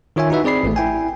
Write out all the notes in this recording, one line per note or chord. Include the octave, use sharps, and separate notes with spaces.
D#3 F4 C#5 E5 G#5
D#4 E4 F#4 B4 E5
C4 G#4 D5 B5 C7
A1 A3
E4 G5 G#5